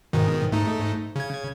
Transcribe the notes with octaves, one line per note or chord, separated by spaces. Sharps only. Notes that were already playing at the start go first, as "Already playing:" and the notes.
G#2 B2 D#3
G#2 A3 D#4
C#3 G#6